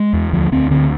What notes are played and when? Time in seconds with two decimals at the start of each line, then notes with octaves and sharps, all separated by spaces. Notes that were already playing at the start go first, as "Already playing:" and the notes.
Already playing: G#3
0.13 E2
0.33 D2 F3
0.52 D2 C4
0.71 D3 C4